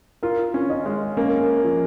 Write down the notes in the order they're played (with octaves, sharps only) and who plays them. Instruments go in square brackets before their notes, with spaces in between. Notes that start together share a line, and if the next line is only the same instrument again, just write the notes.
[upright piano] F4 [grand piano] A#4
[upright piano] C#4
[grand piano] D#5
[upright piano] G#3
[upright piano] A#3 [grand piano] C#4
[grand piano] F3